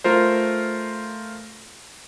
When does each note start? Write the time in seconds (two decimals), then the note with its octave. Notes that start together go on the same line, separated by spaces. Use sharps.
0.04 A3 F4 A#4 C5